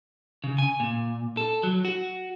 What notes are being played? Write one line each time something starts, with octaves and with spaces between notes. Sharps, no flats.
C#3
G#5
A#2
A4
F#3
F#4